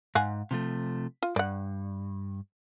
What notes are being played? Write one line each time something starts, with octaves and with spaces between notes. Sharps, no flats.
G#2 F5 F#5 G#5
C3 F3 A3
F4
G2 D5 F#5